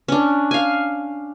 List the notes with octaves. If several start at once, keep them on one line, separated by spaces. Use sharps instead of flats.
C#4 D4
F5 G#5